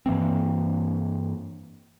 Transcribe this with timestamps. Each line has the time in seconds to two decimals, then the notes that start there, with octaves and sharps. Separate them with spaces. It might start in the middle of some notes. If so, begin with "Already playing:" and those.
0.06 G2 E3 A#3 C4